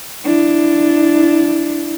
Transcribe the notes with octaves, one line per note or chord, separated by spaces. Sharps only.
D4 E4